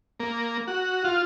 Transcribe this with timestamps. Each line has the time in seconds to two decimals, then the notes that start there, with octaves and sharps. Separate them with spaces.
0.20 A#3
0.68 F#4
1.04 F4